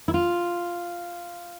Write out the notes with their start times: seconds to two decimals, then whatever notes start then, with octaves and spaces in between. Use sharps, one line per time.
0.08 E4
0.14 F4